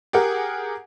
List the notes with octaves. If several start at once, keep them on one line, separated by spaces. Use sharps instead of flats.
G4 G#4 A#4 F#5